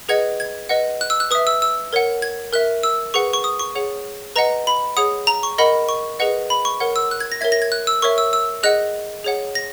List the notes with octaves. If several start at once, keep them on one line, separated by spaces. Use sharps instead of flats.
G#4 B4 D#5 F#5 G#6
G#6
B4 D#5 F#5
F#6
E6
F#6
B4 E5 D#6
E6
E6
A#4 C#5 F#5
G#6
A#4 E5 F#6
E6
G#4 B4 F#5 C#6
C#6
D#6
C#6
G#4 C#5 F#5
B4 D#5 F#5 A#5
B5
G#4 C#5 F#5 D#6
A#5
C#6
A#4 D#5 F#5 B5
C#6
G#4 B4 D#5 F#5
B5
C#6
A#4 C#5 F#5
E6
F#6
G#6
A#6
A#4 C#5 E5 G#6
A#6
G#6
F#6
E6
A#4 C#5 E5 C#6
E6
E6
G#4 D#5 F#5 F#6
G#4 C#5 F#5
A#6